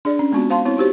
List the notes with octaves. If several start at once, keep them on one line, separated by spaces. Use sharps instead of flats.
D4 G#4 D5
C#4
G#3 B3 C4 F4 F#4
C5 F5 A5 C6
C4 E4 C#5
D#4 F#4 G4 C5